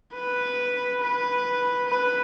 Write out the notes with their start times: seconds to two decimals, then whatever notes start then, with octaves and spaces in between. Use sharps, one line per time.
0.14 B4
1.01 B4
1.88 B4